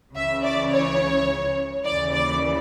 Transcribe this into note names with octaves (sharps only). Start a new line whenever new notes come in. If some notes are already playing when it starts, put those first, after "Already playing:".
C#2 C#3 E3 E5
D5
C#5
D#2 C#3 E3 D5
D5